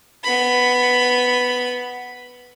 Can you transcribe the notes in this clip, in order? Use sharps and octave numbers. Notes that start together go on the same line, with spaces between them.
B3 B5